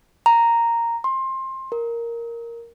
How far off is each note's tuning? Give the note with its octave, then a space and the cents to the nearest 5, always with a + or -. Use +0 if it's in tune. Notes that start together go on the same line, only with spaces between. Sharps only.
A#5 -5
C6 +20
A#4 +0